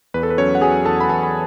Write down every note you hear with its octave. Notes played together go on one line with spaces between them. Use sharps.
E2 B4
A4
B4
F#3 C#4 C#5
F#5
F#3 G#4 G#5
E2 A4 A5
B5
E2 A4 A5
B5